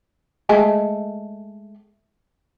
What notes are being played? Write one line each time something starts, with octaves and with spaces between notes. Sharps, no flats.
G#3 A3 A4